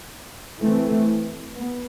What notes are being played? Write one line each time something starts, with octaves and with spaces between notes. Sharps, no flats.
E3 A3 C4
B3